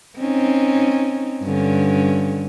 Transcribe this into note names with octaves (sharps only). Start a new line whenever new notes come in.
C4 C#4 D#4
G2 D3 C#4